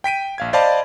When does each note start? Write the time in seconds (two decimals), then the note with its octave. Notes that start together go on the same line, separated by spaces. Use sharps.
0.04 G5 B6 D7 D#7
0.38 A#1 F5 G#6
0.53 C5 D5 D#5 F5 A5 B5